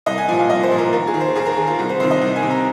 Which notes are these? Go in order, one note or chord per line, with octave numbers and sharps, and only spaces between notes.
C2 D#5
G#5
A#2 F3 G#5
F5
C2 D#5
C5
A#2 F3
A#4
D#2 A#4
G#4
D#3
C5
D#2 G#4
A#4
D#3 G#4
F4
C2
C5
C3 D#3 C5
D#5
C2
G#5
C3 D#3
A#5